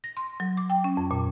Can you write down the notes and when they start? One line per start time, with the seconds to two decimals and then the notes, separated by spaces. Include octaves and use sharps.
0.04 A#6
0.17 C6
0.40 F#3
0.57 D6
0.70 G5
0.84 C#4
0.97 F2
1.11 A#2